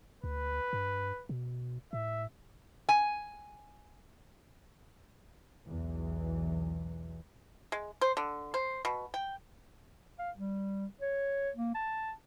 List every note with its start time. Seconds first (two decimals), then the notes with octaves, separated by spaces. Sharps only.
0.24 D2 B4
0.73 G2
1.29 B2
1.93 A2 E5
2.89 G#5
5.67 B1 E2 E3
7.72 G#3
8.01 C5
8.17 D3
8.54 C5
8.85 B2
9.14 G5
10.19 F5
10.37 G3
11.01 C#5
11.56 A#3
11.75 A5